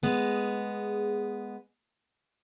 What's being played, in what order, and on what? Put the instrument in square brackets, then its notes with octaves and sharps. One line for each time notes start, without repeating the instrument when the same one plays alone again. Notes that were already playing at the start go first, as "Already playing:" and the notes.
[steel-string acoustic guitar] G#3 B3 G#4